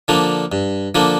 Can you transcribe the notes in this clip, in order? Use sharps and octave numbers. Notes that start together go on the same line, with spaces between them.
D3 F3 A#3 D4
G2
D3 F3 A#3 D4